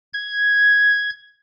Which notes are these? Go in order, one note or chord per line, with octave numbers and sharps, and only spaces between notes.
G#6